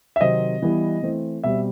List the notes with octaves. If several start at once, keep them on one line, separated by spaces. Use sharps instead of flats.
E5
C3 D#3 F#3 C4 D#5
E3 G3 B3
E3 A3 C4
B2 G3 C4 E5